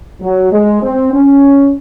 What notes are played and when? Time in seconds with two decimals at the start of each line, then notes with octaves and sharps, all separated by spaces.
0.21 F#3
0.51 G#3
0.82 C4
1.12 C#4